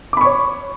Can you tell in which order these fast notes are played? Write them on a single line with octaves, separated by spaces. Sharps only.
D6 B5 C#6 C#5